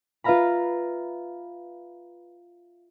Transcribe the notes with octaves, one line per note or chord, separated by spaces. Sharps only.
F4 B4 E5 F5 A#5 B5